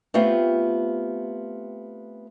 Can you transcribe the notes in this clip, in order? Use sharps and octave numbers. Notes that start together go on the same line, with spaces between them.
A3 B3 C4 F4 G4